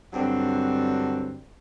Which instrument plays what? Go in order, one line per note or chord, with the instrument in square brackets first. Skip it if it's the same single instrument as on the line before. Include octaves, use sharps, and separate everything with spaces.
[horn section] G2 D3 F#3 C4